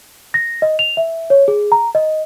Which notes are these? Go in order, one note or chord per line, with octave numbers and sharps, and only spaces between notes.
A#6
D#5
F7
E5
C#5
G#4
A#5
D#5